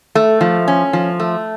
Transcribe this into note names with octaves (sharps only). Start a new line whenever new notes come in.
A3
F3
C#4
F3
A3